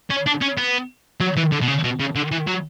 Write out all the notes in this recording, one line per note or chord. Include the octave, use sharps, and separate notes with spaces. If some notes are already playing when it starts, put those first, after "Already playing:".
C#4
D4
C#4
B3
F#3
E3
D3
B2
C#3
B2
C#3
D3
E3
F#3